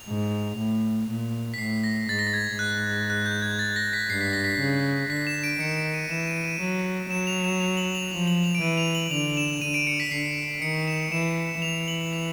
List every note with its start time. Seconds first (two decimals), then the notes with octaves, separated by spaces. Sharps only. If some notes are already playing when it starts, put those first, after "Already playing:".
Already playing: F7
0.08 G#2
0.58 A2
1.09 A#2
1.54 B6
1.58 A2 C7
1.84 A#6
2.09 G#2 A6
2.19 A#6
2.27 A6
2.34 G#6
2.59 G#2 F#6
3.10 F#6
3.26 G6
3.42 G#6
3.59 A6
3.76 A#6
3.93 B6
4.09 G2 C7
4.21 B6
4.33 A#6
4.44 B6
4.60 C#3
5.10 D3 B6
5.27 E7
5.44 D7
5.60 D#3 C#7
5.77 D7
5.94 D#7
6.10 E3 E7
6.27 D#7
6.44 D#7
6.60 F#3
7.11 F#3 E7
7.27 F7
7.44 E7
7.60 F7
7.77 F#7
7.95 F7
8.11 F3 F7
8.27 F#7
8.44 F7
8.55 D7
8.61 E3 D#7
8.77 F7
8.95 F#7
9.11 D3 F7
9.37 E7
9.62 D3 D#7
9.74 D7
9.87 C#7
10.00 B6
10.11 D3 C7
10.62 D#3 C#7
10.88 E7
11.12 E3 E7
11.62 E3 F7
11.88 F#7
12.13 F7